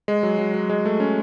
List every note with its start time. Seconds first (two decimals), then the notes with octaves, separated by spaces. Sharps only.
0.08 G#3
0.23 F#3
0.39 F#3
0.54 F#3
0.69 G#3
0.85 A3
1.00 C#4